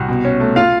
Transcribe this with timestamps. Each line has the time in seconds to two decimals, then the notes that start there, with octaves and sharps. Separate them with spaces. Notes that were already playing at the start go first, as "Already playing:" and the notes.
Already playing: C2 F#4
0.09 B2
0.25 C#4
0.40 A3
0.56 F4 F5